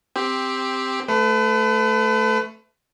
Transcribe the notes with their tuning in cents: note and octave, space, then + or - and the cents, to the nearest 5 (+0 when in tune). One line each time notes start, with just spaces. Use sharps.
C4 +0 G4 +10
A3 +0 B4 +35